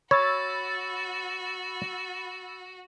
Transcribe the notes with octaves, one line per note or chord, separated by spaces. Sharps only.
F#4 C#5 B5 E6 A6